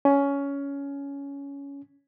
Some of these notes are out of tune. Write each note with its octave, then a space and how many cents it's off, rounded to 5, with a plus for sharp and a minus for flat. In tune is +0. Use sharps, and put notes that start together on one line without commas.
C#4 +15